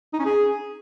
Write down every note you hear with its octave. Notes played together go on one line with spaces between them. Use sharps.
D#4
C#4
G#4